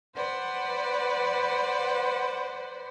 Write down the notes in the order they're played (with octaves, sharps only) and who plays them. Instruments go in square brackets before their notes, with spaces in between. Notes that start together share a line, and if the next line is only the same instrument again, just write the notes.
[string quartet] B4 C5 D5 F#5